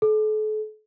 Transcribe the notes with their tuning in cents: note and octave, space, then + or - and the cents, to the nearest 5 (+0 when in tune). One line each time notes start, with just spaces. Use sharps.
A4 -40